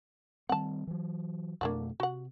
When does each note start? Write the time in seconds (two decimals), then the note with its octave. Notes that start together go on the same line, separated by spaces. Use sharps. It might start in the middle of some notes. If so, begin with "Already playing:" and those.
0.49 D#3 G3 C4 F#5 A5
0.87 E3 F#3
1.61 F2 B2 A3 A#3 D4 F#4
2.00 C3 F#4 F#5